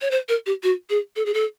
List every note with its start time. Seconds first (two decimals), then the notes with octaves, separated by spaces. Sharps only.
0.01 C#5
0.11 C5
0.29 A#4
0.46 G4
0.63 F#4
0.90 G#4
1.16 A4
1.26 G#4
1.34 A4